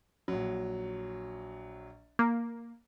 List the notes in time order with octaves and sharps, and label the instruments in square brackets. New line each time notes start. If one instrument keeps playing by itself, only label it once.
[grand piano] A#1 F#3
[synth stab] A#3